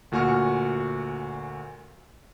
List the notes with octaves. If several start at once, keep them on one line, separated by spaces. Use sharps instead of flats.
D2 A#2 F#4 G#5 C#6 F6